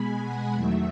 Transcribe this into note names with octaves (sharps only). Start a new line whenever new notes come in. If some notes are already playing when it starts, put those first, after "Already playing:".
Already playing: B2 G#3 G#5 B5
F#5
E2 D#3 F#3 A3 E5